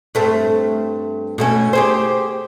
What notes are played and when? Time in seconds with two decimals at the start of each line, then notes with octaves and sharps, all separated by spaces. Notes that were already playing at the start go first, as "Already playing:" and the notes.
0.15 G2 A3 C4
1.38 B2 A3 C#4
1.73 G4 G#4 C5